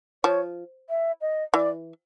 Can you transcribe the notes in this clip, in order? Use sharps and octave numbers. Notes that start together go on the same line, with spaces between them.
F3 C#5
E5
D#5
E3 D5